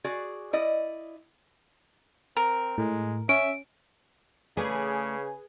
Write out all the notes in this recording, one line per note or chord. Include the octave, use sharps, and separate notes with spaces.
F#4 G#4 D5
E4 D5 D#5
C4 A#4
A2 G#3
C#4 E5 D7
C#3 A3 G#4 B4 C#5 D5 G#5